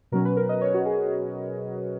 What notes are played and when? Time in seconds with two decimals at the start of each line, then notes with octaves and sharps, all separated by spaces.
0.12 B2 F#3 C#4 A#4
0.25 B4
0.37 A#4
0.49 D#5
0.61 C#5
0.74 F#4
0.85 G#4